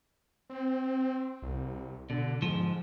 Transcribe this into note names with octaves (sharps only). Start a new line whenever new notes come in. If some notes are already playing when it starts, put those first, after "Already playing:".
C4
C2
B2 D3
G#2 F3